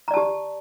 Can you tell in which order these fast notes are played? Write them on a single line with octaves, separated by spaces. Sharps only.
A#5 D5 A5 G4